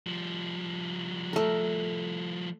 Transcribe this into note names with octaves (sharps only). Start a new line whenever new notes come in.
F3 G3
A3 A#4